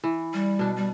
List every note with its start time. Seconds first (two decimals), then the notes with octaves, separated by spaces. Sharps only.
0.04 E3
0.34 G3
0.59 B2 D4
0.77 G3